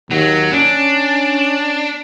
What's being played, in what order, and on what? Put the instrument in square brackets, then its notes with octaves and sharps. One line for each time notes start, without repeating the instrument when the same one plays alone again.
[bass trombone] D#2 [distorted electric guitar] F#3
[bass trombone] C#4 [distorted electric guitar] D4